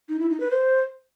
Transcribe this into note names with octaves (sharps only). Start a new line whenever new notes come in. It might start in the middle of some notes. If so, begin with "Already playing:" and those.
D#4
E4
D#4
B4
C5